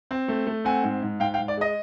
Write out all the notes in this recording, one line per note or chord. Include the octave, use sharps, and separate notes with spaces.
C4
A3
A3
C4 F#5 G#5
G#2
G#2
G#2 F5 G5
F5 G5
G#2
D5
G#3 D#5